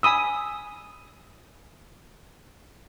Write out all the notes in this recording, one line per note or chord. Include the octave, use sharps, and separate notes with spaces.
G#5 B5 D#6 E6